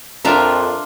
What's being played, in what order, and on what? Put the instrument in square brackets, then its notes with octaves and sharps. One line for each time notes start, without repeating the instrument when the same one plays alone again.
[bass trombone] F2 [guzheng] D4 F4 E5 [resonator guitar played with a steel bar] A#4 A#5